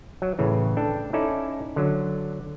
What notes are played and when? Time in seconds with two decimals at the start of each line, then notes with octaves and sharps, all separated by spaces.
0.22 F#3
0.39 A2 C#3 E3
0.77 D4 A4 G5
1.13 C#4 D#4 E4 A4 D5
1.76 D3 F#3